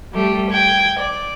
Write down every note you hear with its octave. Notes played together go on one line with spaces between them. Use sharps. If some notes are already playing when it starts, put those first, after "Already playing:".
G3 A3 G4
G5 G#6
D5